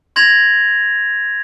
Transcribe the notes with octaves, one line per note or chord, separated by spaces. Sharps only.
C6 G#6 A#6 F7